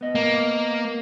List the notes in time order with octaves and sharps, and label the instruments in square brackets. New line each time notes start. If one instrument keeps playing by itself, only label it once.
[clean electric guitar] B3 D#5
[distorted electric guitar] A#3